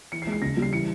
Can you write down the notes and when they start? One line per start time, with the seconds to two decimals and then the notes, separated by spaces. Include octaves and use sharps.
0.12 E3 C#7
0.22 C7
0.27 G#3
0.32 C7
0.42 C#3 A#6
0.57 G3
0.62 C7
0.73 E3 C#7